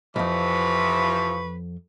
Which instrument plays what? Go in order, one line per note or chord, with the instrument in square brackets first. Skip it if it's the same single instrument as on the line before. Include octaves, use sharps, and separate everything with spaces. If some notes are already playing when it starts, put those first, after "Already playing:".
[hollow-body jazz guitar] B1 F2 [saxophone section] C3 E3 F3 [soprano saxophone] B4 [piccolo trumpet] C#6